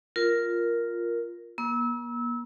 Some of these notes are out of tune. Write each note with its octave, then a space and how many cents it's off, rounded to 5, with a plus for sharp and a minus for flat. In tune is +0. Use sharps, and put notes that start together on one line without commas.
F4 +0 A#4 +0
A#3 +45 E6 -25